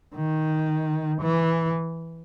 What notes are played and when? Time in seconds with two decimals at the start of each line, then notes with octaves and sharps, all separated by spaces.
0.16 D#3
1.21 E3